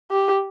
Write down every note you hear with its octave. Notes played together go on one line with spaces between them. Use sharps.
G4